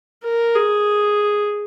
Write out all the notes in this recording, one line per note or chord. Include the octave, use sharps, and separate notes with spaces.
A#4
G#4